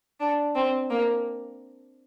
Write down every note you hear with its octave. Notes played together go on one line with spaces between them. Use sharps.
D4
C4
A#3